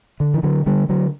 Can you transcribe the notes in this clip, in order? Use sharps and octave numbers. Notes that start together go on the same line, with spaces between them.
D3
E3
D3 F#3
D3 G3
D3 F#3